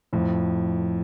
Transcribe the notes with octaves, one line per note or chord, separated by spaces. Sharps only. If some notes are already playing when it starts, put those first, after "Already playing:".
F2 A2